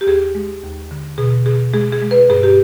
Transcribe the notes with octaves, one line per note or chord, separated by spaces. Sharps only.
G4
D#2 G#4
G#3
D#2
D3
B2 G#4
B2 G#4
G#3 G#4
G#4
G#3
B4
G2 G#4
G4